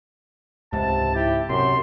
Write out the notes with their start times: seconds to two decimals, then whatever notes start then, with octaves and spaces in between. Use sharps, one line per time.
0.73 C#2 G#2 C3 A5
1.15 E4 G4
1.49 F#2 C3 C6